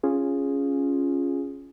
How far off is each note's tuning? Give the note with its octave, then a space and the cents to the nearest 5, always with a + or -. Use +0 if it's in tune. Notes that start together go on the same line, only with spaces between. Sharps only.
C#4 +0 F4 -5 G#4 -5